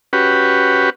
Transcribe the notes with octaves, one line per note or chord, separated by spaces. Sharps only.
C#4 F#4 G4 B4